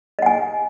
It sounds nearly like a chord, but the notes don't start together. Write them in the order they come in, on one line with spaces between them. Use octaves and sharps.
D#5 F#5 G#5